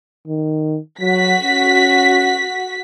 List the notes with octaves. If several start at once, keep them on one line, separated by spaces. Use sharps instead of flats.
D#3
F#3 F#4 B6
C#4